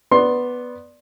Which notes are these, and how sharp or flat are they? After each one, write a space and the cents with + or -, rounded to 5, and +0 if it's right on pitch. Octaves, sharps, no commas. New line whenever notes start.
B3 +0 D5 +0 C6 +15